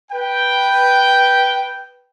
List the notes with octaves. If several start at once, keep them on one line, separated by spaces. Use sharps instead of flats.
B4 G5